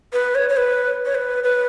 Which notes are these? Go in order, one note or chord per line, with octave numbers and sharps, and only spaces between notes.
B4
C#5
C#5
B4
C#5
B4
B4